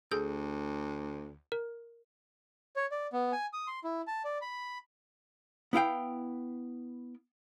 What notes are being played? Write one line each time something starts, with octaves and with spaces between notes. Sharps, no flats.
D2 G#4 A4 G6
A#4
C#5
D5
B3
G#5
D#6
C6
E4
A5
D5
B5
B3 E4 F5 G5